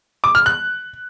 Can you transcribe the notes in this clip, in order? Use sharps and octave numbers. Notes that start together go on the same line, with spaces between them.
D6
F6
F#6